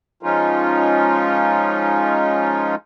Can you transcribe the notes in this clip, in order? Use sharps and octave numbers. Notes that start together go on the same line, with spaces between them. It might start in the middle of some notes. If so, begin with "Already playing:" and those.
F3 G#3 C#4 D#4 F4